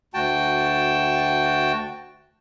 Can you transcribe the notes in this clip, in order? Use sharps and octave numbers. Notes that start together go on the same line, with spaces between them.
D2 F#4 G5 A5